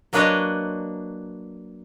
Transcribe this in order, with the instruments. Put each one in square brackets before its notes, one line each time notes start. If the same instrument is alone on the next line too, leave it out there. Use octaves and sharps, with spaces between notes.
[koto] F#3 A#3 D4 B4 C#5 D#5